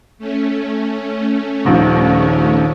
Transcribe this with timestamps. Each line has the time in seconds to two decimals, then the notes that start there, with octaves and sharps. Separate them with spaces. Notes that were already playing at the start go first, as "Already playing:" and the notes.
0.19 A3 C#4
1.65 D#1 A#1 D#2